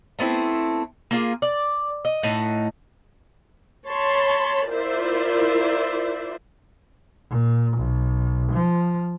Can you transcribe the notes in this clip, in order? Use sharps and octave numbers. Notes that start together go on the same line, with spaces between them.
A3 B3 C4 E4
A#3 F4 G#4
D5
D#5
A2 D#4 F#5
C#5 A5 B5 C6
E4 F4 A#4 C5 D5 E5
A#2
B1
F3